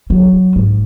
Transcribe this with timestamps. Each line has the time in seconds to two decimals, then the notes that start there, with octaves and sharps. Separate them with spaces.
0.10 F#3
0.56 G#2